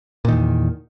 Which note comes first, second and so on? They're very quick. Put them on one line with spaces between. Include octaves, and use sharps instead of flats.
A#2 D#3 E2